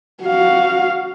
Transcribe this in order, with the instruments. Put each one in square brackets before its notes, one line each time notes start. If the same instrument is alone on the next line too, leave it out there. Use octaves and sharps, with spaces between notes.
[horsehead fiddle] F#4 F5